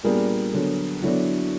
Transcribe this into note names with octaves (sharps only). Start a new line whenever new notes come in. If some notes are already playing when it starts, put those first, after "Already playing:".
A#2 G3 B3 D4 G#4 A#4
D3 F#3 B3
D3 F#3 B3 D4 E4 F#4